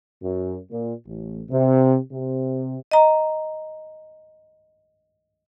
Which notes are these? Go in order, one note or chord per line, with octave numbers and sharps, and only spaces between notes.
F#2
A#2
A1
C3
C3
D#5 A#5